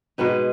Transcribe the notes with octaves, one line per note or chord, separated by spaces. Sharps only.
B2 G#3 B3 D#4